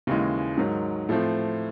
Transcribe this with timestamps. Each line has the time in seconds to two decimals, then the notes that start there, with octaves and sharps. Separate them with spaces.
0.07 D#2 C#3 E3 G#3
0.57 G#2 D#3 F#3
1.09 A2 F3 A3 C4